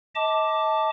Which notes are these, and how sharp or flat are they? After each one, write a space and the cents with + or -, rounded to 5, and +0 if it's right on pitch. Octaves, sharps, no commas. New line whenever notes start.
D#5 +35 A5 +0 D6 +0